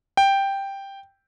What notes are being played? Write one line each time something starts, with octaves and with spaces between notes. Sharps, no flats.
G5